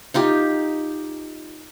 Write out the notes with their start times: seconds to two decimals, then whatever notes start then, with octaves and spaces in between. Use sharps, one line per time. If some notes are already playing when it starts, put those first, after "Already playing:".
0.14 D#4 F4 G4